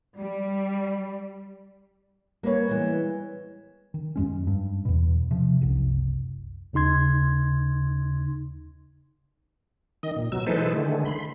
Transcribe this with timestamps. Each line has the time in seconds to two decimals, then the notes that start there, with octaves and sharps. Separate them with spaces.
0.17 G3
2.43 G3 A#3 B4 C#5
2.68 E3 G#3 B3
3.94 D#3
4.16 F#2 G#3 C#4
4.47 G2
4.85 E2 B2
5.31 C3 F3
5.61 F#1 C2
6.73 D#2 C#3 D#4 C6 G#6
10.03 D#3 D#5
10.17 A#2
10.32 B2 F#3 E6
10.46 E3 G#3 D#4 A4 B4 C5
10.74 D3 D#3 G#3 A3
11.05 B5 C6